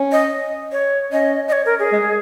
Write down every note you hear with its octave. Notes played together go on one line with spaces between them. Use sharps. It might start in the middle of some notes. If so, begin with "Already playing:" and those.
Already playing: C#4
D#5
C#5
C#4 D#5
D#5
C#5
A#4
G#4
G#3